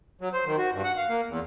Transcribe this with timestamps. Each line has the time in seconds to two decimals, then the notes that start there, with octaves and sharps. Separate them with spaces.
0.21 F#3
0.33 C5
0.46 D#3
0.58 F#4
0.72 G2
0.84 F#5
0.97 F5
1.09 A#3
1.28 E2